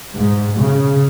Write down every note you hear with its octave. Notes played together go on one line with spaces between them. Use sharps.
G#2
C#3